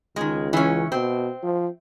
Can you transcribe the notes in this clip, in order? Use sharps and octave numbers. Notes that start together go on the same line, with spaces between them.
C#2 D#3 G#3
E3 C#4
B2 C4
F3